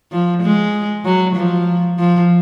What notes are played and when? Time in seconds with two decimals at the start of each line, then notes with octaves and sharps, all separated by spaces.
0.12 F3
0.42 G#3
1.05 F#3
1.36 F3
1.98 F3